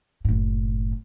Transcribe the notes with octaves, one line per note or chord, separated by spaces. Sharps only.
F#1 A2